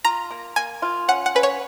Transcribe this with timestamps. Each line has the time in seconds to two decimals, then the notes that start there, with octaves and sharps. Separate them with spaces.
0.04 F4 A#5
0.31 A#3
0.56 A#3 G#5
0.82 F4
1.08 C#4 F#5
1.26 F#5
1.35 C#4 B4
1.43 C#5